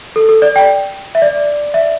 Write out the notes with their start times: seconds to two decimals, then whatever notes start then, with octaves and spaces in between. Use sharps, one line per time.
0.16 A4
0.29 A4
0.42 D5
0.56 G5
1.15 E5
1.22 D5
1.74 E5